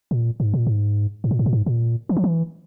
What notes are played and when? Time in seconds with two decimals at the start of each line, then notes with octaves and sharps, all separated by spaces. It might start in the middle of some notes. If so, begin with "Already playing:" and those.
0.11 A#2
0.40 G#2
0.54 A#2
0.67 G#2
1.24 G#2
1.31 A#2
1.39 G#2
1.46 A#2
1.53 G#2
1.66 A#2
2.09 E3
2.17 F3
2.24 E3